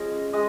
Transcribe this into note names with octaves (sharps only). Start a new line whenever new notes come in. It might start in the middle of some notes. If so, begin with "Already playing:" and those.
Already playing: F3 G#3 C#4 D#5
G#3 D#5